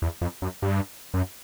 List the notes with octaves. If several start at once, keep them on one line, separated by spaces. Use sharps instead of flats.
E2
F2
F#2
G2
F#2